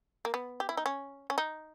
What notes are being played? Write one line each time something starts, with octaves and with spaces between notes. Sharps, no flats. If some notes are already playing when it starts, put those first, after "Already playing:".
A#3
B3
G4
E4
D#4
C#4
C#4
D#4